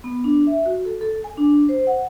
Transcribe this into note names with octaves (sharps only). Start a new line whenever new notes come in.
B3
D4
E5
F#4
A4
A4
G#5
D4
C5
F#5